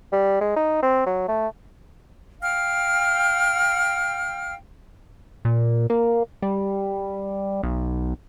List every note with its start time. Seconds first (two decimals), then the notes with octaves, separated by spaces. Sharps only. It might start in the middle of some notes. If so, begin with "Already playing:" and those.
0.12 G3
0.41 G#3
0.56 D#4
0.83 C4
1.06 F#3
1.28 A3
2.41 F5 G5 F6
5.45 A#2
5.90 A#3
6.42 G3
7.63 B1